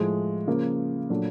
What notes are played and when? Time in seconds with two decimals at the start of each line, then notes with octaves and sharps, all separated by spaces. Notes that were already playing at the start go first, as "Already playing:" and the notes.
Already playing: A2 F3 G#3
0.47 C#3 F3 A#3
1.10 A#2 F#3 A3 D4